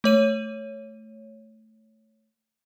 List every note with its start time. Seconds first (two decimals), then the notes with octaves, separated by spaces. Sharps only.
0.04 A3 C#5 D#7